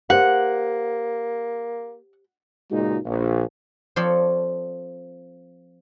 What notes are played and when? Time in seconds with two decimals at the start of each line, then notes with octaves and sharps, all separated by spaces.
0.10 A#3 G4 C5 F#5
2.71 C#2 A#2 G#3 D#4 F#4
3.05 A#1
3.96 F3 C4 A4 C#5 D5